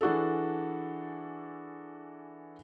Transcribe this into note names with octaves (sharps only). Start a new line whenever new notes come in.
E3 D4 F#4 G#4 A4